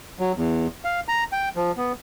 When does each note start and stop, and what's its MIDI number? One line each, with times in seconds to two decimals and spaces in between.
0.19 0.32 54
0.37 0.67 40
0.85 1.00 77
1.08 1.24 82
1.32 1.49 79
1.56 1.72 53
1.77 1.92 59